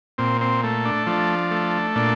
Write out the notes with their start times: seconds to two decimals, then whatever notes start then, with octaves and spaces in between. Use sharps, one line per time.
0.18 A#2 C4
0.41 C4
0.63 A3
0.85 D4
1.07 F3 D4
1.51 A3
1.96 A#2 D4